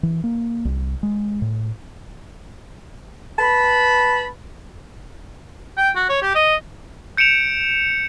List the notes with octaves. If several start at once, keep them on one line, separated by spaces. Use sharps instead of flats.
E3
A#3
C2
G#3
A2
B4 A5 B5
G5
F#4
C#5
G4
D#5
G6 C#7 D7 E7 F7